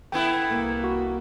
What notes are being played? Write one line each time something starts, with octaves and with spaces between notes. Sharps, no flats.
A3 B3 E4 G5
C2 A#3
F#4